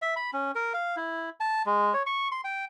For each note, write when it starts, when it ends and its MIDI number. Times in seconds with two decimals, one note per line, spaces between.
0.02 0.14 76
0.16 0.31 83
0.33 0.52 61
0.55 0.73 70
0.74 0.96 77
0.97 1.30 64
1.40 1.62 81
1.66 1.94 56
1.94 2.03 73
2.06 2.28 85
2.32 2.41 84
2.44 2.65 79